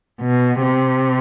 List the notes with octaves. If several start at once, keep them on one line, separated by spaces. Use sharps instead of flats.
B2
C3